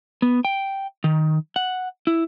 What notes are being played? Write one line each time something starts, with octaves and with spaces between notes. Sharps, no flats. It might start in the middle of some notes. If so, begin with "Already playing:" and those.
B3
G5
D#3
F#5
E4